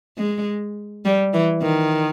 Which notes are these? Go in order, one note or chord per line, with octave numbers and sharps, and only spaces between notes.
G#3
G3
E3
D#3